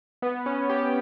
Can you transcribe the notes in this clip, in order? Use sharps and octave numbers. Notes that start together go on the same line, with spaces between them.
B3
C#4
G4